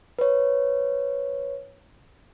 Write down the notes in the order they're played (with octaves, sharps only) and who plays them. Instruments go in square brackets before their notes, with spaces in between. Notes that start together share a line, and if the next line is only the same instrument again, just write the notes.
[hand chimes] B4 C#5